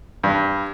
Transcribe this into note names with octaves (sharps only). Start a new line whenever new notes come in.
G2